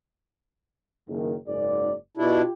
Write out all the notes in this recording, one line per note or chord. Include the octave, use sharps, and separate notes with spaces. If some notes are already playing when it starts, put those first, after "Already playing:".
F#1 D#3
F#1 G#2 D5
B2 D4 E4 F4 G4